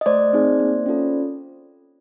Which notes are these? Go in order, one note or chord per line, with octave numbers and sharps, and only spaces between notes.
D#5
A3 C5 D5
C4 D#4 G#4
A#3
C#4 F4 A4